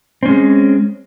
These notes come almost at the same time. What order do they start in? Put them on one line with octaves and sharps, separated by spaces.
C4 C#4 G#3